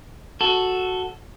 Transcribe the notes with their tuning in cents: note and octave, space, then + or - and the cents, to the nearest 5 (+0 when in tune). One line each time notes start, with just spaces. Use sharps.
F#4 +0 A4 +0